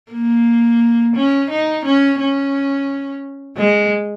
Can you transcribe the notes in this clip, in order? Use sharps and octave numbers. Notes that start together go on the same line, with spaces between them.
A#3
C#4
D#4
C#4
C#4
G#3